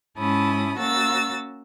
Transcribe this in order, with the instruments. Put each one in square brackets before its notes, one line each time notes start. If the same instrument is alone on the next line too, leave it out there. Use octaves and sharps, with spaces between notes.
[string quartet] G#2 C#4 E4 A5 B5 D#6
A#3 C#4 F#4 E6 A6